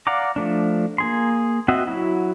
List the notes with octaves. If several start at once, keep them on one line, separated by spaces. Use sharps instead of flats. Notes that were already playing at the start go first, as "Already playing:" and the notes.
D5 F5 F#5 A#5 D6
F3 A3 D4
A#3 G#4 C6
C4 F#4 D#5 E5 F#5
F#3 E4 F#4